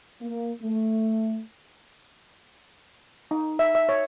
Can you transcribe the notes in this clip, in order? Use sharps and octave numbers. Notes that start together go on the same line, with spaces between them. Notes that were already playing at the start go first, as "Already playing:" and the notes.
A#3
A3
D#4
E5
E5
C#5